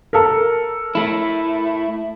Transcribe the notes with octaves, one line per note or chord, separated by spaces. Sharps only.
A4 A#4
A3 E4